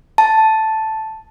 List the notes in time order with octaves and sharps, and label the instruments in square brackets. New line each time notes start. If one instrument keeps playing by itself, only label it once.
[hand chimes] A5